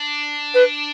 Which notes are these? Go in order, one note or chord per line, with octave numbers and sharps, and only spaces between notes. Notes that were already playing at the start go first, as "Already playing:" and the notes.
Already playing: D4
B4